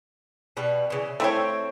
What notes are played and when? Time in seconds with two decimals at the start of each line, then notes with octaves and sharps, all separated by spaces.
0.57 B2 G3 B4
0.90 C#3 E3
1.20 A3 C4 E4 C#5 G5